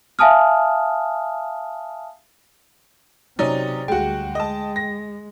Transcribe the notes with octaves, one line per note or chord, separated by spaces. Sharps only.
E5 F5 G#5 A5 D#6 F6
C3 F#3 C#4 D#4 D5
D2 G3 G#3 F#4 G5
G#3 D#5 A5
A#6